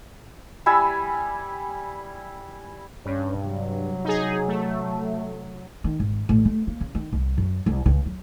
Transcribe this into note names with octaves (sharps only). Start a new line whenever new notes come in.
G3 E4 G#5 E6
G2 C#4
C3 F#3
D#4 G#4
A3
D#3
G#1
A1
A3
A#3
C#3
D#3
C2
F#2
C2
C#2
F#3